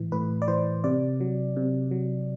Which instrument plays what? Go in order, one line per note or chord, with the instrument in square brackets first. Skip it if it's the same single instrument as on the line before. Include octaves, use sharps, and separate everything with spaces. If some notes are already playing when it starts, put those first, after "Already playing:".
Already playing: [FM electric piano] A2 E3
A2 B4
D5
E3 C5
C3 D5
F#3
C3
F#3